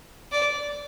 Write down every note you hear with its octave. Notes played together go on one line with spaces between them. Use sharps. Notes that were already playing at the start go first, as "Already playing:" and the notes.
D5